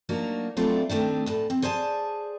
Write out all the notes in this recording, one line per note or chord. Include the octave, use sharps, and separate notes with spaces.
F#3 A#3 D4 D#4 F#4
F#3 A3 C4 D4 E4 F4
D#3 A3 C4 D4
D2 A2 A5
C4
G#4 C5 D5 G#5 A5